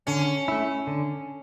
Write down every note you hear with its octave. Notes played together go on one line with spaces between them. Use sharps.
D3 C#4
A3 E4
D3